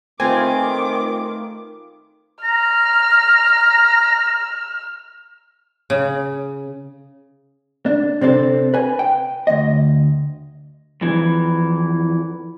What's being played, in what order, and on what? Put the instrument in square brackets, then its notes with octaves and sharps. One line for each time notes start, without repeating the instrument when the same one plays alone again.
[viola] D#3 D6 [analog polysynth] A3 F4 B4 [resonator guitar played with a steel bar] C4 [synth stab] G#5
[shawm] A#5 [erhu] F6
[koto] C#3
[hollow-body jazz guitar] D4
C3 C4 D4 A4
B4 G#5
G5
D2 D#5
[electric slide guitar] F2 E3